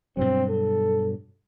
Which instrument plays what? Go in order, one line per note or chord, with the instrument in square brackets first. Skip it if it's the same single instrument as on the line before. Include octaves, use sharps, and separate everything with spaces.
[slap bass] G2 B2 F#3 [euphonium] C4
[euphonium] A4